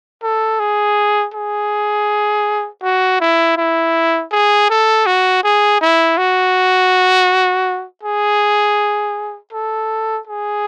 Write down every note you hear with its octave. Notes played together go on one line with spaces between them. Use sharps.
A4
G#4
G#4
F#4
E4
E4
G#4
A4
F#4
G#4
E4
F#4
G#4
A4
G#4